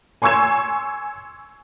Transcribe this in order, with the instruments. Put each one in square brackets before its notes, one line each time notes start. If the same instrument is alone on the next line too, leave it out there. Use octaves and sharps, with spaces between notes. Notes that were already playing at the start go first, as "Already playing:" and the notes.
[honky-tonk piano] G#5 C6 C#6 E6 G#6 E7